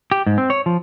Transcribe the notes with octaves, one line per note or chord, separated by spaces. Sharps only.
G4
G#2
C4
C#5
F3